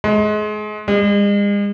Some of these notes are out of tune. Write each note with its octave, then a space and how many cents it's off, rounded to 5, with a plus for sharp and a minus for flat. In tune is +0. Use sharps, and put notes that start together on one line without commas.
G#3 +30
G#3 -40